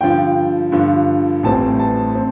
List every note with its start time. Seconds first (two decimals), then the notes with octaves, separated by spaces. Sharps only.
0.01 G2 D3 F3 G5
0.72 G2 D3 F3
1.43 A1 A2 E3 G3 C4 A5
1.79 A5
2.15 C4